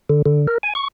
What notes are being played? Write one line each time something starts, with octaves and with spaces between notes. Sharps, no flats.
D3
D3
A#4
G#5
C#6